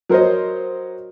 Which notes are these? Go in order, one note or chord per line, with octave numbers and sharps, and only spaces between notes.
F#3 A#4 C5 C#5 D#5